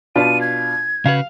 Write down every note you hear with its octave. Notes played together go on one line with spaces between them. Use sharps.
B2 D4 F4 D#7
G#6
C#3 F#4 B4 F5